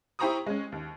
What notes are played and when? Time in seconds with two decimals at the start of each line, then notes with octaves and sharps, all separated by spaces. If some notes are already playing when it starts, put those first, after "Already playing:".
0.19 E4 G4 C5 A#5 C#6 D#6
0.46 G#3 C#4
0.72 D#2